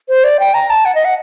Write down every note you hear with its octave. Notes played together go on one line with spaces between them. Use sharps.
C5
D5
G5
A#5
A5
F#5
D#5
F#5